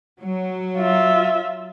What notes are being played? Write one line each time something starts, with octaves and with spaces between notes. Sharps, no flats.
F#3
F4 E5